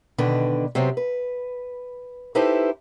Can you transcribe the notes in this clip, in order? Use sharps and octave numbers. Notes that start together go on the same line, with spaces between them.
B2 D3 D#3 D4 B4
C3 F#3 B3 C4
B4
D#4 E4 G4 A4 B4 C5